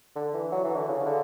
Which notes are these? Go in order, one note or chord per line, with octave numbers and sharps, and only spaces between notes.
D3
E3
F#3
E3
D3
C#3
D3